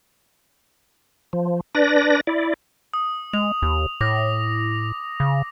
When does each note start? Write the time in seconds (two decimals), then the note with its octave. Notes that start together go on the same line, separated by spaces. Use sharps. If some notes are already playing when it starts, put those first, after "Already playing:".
1.33 F3
1.75 D4 B4 D5 A#6
2.27 E4 D5
2.94 D#6
3.33 G#3 F7
3.62 D#2
4.01 A2 D6 A#6
5.20 C#3